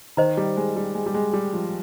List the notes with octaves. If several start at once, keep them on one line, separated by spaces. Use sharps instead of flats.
D#3 C5 D#5 A#5
G3
G#3
G3
G#3
G3
G#3
G3
F3